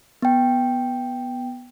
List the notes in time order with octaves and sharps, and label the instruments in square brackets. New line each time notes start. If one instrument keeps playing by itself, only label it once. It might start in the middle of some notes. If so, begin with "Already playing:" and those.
[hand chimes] B3 G5